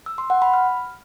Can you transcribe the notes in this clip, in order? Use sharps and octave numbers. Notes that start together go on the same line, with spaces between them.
E6
C6
F#5
B5
F6